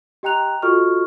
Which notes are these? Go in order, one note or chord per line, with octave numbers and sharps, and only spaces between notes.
G4 D#5 G5 A#5 F#6 F7
F4 F#4 A4 D#5 C#6 F6